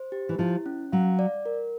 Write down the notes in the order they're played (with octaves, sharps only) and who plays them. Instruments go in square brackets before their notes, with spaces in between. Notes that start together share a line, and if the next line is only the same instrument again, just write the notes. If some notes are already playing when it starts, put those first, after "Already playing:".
Already playing: [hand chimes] C5
G4
[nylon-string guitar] E3
[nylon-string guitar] F3 [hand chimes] E4
[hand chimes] C#4
[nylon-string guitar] F#3 [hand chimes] F5
[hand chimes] D5
A#4